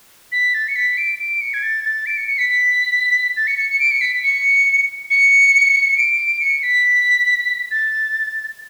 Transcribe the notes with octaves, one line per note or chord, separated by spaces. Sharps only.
B6
A6
C#7
B6
D7
D7
C#7
G#6
A6
A6
D7
C#7
C#7
B6
B6
A6
C#7
C#7
C#7
D7
C#7
B6
C#7
C#7
C#7
D7
C#7
B6
A6